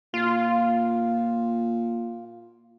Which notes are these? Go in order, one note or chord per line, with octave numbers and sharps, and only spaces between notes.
A#2 F4